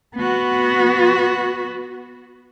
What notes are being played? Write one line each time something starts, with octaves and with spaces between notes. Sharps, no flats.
B3 F#4